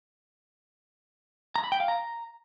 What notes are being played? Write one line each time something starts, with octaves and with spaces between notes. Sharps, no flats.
A#5
B5
G5
F5
A#5